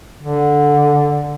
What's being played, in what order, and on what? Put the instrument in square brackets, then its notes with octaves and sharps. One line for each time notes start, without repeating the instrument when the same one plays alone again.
[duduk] D3